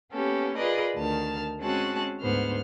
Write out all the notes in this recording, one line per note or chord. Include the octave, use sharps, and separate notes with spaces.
A#3 B3 C#4 G4 A4
F4 G#4 A#4 B4 D5 D#5
D2 D#3 A5 F6
G#3 C4 C#4 F#4 A5 F#6
D2 G#2 B3 C5 F6